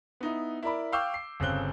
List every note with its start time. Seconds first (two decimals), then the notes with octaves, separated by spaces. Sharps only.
0.21 B3 D#4 E4
0.63 E4 A#4 D5 B5
0.92 F5 G5 C#6 D6 E6 G6
1.14 C7
1.40 G1 C#3 C4 F#6 G7